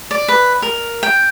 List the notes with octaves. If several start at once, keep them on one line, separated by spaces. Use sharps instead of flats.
D5
B4
A#4
G5